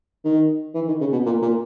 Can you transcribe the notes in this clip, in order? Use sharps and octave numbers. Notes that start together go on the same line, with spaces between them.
D#3
E3
D#3
C#3
B2
A#2
A#2